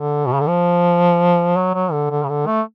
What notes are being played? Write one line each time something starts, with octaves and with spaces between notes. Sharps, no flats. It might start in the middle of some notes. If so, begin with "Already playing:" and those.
Already playing: D3
B2
C#3
D3
F3
F#3
F#3
D3
D3
C#3
D3
A3